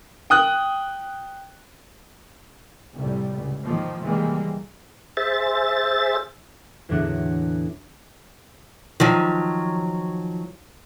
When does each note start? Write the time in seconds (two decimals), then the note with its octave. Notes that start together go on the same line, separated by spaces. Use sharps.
0.30 G5 D#6 F#6
2.96 F1 C2 A2 C3 G3
3.35 C#2
3.64 G#2 D#3 F3 A#3
4.02 C3 D#3 E3 G3 G#3 A#3
5.17 G#4 C5 E5 A6
6.89 E2 A2 D3 F#3 D4 F#5
9.00 D#3 F3 F#3